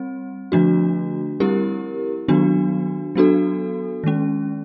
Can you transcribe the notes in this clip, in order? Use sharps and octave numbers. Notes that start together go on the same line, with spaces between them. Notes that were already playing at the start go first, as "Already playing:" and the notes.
Already playing: G3 C4
D3 F3 A3 D4 F#4
G3 C4 E4 G4 A#4
D#3 F#3 B3 D4 F#4
F#3 B3 D4 F#4 A4
D#3 G#3 C#4